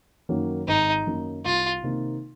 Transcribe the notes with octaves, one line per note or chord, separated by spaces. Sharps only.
F#2 D#3 F#3 A#3
G#1 D#4
F#2 D#3 F#3 A#3
C2 F4
C3 D#3 A#3 D#4